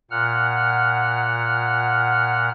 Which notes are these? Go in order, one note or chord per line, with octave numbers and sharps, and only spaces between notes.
A#2 F#5 F6